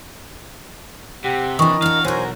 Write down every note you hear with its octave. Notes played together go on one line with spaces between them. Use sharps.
C3 G4 F#5
E3 D4 A#4 D#5 G5 A#5 C#6 D#6
D4 F#4 F5
B1 F#4 A#4 C5 C#5 G#5